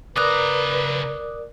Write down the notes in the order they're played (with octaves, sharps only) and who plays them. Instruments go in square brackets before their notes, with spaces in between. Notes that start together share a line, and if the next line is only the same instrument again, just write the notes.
[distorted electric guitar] C#3 A#5 [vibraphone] A#4 D5 [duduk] B4 [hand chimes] D6 D#6 F#6